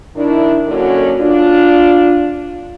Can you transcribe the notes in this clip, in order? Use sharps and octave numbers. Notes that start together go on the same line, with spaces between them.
D#3 D4 E4
F#2 D3 F#3 A#3 C#4 F#4
D4 F4